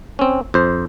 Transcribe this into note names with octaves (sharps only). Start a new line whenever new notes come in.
C4 C#4
F2 C5